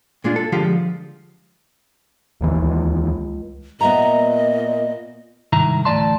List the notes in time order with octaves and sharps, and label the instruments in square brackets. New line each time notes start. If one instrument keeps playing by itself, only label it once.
[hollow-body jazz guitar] A#2 G#3 D4 F4
A4
D3 F3 G#3 F4 G4
[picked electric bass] D1 D#2 E3 [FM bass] G1
[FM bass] C#2
[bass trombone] A#2 [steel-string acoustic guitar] B3 E5 A#5 [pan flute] D#5
[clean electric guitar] C2 G#2 D#3 E4 A#5
D2 A2 E3 D5 A5 C6